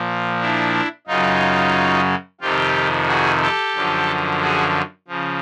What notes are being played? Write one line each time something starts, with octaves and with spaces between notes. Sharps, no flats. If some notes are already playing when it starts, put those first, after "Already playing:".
Already playing: A#2 F3
D4 E4
F#2 C#3 F#3 D#4 F4
F2 C3 D#3 F4 G4
F#4 G#4
G4 A4
F#2 D3 F3
F#4 G#4
C#3 F3